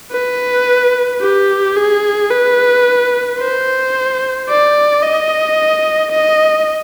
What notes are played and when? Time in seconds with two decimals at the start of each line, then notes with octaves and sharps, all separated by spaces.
0.12 B4
1.21 G4
1.77 G#4
2.31 B4
3.40 C5
4.49 D5
5.03 D#5
6.12 D#5